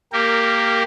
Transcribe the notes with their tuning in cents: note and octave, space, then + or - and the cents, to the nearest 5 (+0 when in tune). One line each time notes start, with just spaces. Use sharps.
A#3 -15 G4 +0 A#4 -20